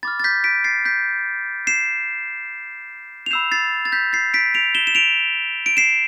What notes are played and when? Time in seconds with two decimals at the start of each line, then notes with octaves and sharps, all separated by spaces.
0.03 B5 D6 F6 A6
0.20 A6
0.24 G6 B6
0.44 B6 D7
0.64 A6 C7
0.85 G6 B6
1.67 C7 E7
3.26 F7
3.31 B5 E6 G6 C7 E7
3.52 A6 C7
3.85 A6
3.92 G6 B6
4.13 A6 C7
4.34 B6 D7
4.54 D7 F7
4.75 E7 G7
4.87 E7
4.95 D7 F7
5.66 D7
5.77 C7 E7